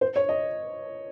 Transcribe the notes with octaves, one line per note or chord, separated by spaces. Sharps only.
C5
C#5
D#5